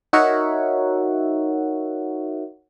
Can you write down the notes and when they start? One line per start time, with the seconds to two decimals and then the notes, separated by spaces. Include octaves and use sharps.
0.13 D#4 F#4 A#4 C#5 E5 F#5